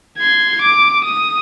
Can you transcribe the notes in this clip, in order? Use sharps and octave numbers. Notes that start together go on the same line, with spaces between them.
C6 G#6
D6
D#6